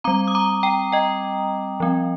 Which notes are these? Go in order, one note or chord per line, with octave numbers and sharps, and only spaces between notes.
G3 C4 A#5 D6
D#6
A#5 D6
G5 A#5
D#5 G5
F3 C4